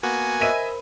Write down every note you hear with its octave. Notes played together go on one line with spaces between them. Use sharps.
A#3 B3 F#4 G#5
A#4 C5 D#5 E5 B5 D#7